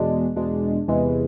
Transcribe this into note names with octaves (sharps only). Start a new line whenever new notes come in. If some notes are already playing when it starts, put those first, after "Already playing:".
Already playing: E2 B2 G#3 D4
E2 B2 G#3 D4
E2 C3 E3 G#3